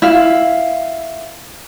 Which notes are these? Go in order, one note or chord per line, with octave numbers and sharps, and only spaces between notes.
E4 F5